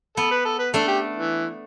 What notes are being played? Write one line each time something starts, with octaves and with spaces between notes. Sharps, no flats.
B3 A4
B4
A4
B4
A3 D4 A4
G4
E3